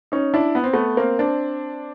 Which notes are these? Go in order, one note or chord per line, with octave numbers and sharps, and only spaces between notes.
C#4 D#4
D4 E4
B3
C4
A3 B3
A#3 C4
C4 D4